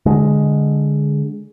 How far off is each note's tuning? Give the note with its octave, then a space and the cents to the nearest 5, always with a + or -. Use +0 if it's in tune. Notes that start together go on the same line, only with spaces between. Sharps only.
D3 +0 G#3 +0